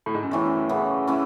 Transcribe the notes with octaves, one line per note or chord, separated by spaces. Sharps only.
A2
G#2
F#2
E2 A2 E3 A3
F#2
F#2
C#3 E3 B3
E3 A3 C#4